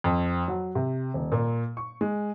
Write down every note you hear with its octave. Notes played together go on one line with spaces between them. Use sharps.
F2
F#3
C3
D#1
A#2
C#6
G#3